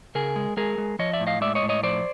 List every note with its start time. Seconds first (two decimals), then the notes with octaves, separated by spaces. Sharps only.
0.15 C#3 G#4 A#4
0.36 G#3
0.57 G#3 G#4 A#4
0.78 G#3
0.99 F3 C#5 D#5
1.13 D5 E5
1.20 A2
1.27 D#5 F5
1.41 G#3 D5 E5
1.55 C#5 D#5
1.62 A2
1.69 C#5 D#5
1.83 F3 C5 D5